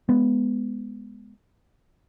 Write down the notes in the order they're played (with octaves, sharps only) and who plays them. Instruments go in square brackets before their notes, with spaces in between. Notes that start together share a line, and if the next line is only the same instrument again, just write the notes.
[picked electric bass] G#3 B3